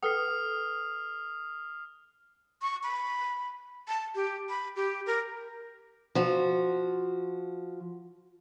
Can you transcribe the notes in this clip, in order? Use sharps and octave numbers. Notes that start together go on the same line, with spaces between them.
A4 B4 G5 D#6 F6 C7
C#6
B5
A5
G4
B5
G4
A#4
F3 F#4